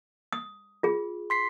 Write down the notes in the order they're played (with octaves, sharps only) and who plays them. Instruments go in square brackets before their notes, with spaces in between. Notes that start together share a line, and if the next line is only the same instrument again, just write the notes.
[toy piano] D#6
F4 G#4
[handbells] C6 B6 C7